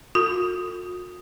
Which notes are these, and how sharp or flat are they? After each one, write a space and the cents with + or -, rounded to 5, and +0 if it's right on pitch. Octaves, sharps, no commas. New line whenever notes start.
F#4 -45 A4 +40